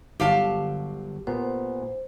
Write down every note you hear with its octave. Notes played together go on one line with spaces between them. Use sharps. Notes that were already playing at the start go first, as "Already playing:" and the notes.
G1 F#3 G4 F5 G5 A5
A#2 B3 C5